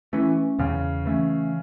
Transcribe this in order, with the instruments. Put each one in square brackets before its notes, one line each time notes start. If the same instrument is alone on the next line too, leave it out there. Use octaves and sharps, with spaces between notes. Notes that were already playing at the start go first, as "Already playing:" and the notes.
[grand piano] E3 [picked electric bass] A3 C#4
[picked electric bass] E2 [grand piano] C#3
[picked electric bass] E3 A3 C#4